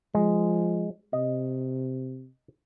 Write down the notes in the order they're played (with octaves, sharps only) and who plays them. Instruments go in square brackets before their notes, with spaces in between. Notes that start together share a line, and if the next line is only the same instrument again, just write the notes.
[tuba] F3 [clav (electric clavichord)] G#3
[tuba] C3 [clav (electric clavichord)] D#5